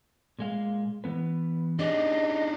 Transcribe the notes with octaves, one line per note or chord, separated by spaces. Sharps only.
A#2 G#3 F5
E3 B3 B4
D4 D#4 G4 G#4 C#5 D#5